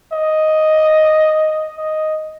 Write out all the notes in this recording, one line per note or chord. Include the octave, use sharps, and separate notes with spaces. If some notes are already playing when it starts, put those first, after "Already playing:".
D#5
D#5